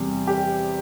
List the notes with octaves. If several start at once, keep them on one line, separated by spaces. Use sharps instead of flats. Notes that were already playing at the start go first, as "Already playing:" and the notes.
Already playing: E2 C3 G3
G4